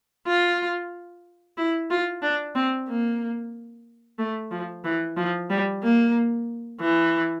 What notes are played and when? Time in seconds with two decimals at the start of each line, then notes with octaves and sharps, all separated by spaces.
0.27 F4
1.57 E4
1.90 F4
2.23 D4
2.55 C4
2.88 A#3
4.19 A3
4.51 F3
4.84 E3
5.17 F3
5.50 G3
5.83 A#3
6.81 E3